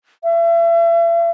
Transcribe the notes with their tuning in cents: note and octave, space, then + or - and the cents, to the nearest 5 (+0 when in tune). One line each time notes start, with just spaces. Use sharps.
E5 +40